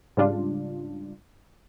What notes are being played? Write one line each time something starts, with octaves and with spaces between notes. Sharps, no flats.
G#2 C#3 G3 D4 F4